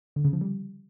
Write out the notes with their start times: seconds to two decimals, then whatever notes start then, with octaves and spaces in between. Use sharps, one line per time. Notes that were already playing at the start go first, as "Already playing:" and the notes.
0.16 D3
0.25 C#3
0.33 F3
0.41 G3